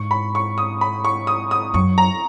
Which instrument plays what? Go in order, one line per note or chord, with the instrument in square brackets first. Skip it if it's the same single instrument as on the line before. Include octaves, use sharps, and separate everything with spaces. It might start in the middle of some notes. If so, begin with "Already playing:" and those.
Already playing: [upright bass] G#2 [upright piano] C#6
[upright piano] B5
C#6
D#6
B5
C#6
D#6
D#6
[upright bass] F#2 [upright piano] C#6
[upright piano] A#5